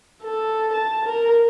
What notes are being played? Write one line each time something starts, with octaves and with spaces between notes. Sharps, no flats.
A4
A5
A#4